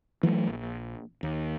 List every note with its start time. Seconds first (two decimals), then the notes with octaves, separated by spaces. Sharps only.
0.23 E3 F#3 G#3 A3
0.47 A#1
1.23 D#2